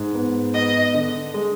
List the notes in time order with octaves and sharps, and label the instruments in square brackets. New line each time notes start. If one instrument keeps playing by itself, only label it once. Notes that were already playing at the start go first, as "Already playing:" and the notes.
Already playing: [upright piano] G#2
B3
[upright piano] B3 [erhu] D#5
[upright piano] D3
G#3